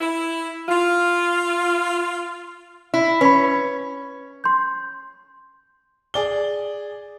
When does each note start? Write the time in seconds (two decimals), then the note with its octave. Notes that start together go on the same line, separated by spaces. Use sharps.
0.01 E4
0.69 F4
2.94 E4
3.21 C#4 B4 B5
4.44 C6 G6
6.14 G#4 D5 G7